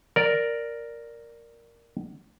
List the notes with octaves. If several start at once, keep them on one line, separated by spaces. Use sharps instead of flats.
A#4 D5